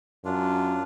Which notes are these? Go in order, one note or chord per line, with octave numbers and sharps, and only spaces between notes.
F#2 D4 F4